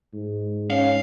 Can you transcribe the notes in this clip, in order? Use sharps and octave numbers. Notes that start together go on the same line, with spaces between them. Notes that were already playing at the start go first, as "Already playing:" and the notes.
G#2
C#4 F5